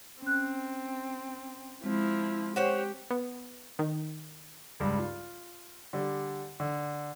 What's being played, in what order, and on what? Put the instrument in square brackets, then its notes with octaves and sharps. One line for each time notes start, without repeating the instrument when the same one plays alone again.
[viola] C4 [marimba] C#4 F#6
[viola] F3 E4 [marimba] G#3 C4
[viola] G4 [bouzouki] C5 C#5 F#5
[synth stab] B3
D#3
[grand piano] C#2 G2
F4
D3 G3
D3